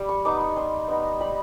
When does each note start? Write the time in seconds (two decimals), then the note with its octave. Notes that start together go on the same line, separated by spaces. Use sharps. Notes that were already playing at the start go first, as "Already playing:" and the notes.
Already playing: G3
0.09 C#6
0.25 B3 D#4 D6
0.41 C#6
0.56 G3 C6
0.88 B3 D#4
1.20 G3 B5